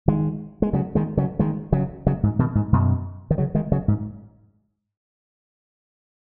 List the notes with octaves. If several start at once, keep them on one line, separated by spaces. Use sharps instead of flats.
D#3 G#3
G#3
C#3 F#3
D#3 G#3
C#3 F#3
D#3 G#3
C#3 F#3
C#3 F#3
G#2
B2 D#3
G#2
F#2 B2
D#3
C#3 F#3
D#3 G#3
C#3 F#3
G#2